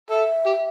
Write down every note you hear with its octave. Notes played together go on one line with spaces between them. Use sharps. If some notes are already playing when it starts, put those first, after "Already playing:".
A4 E5
G4